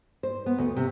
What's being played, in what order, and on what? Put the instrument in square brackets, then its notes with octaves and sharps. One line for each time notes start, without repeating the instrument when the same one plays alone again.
[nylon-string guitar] C5
B3
D2
C3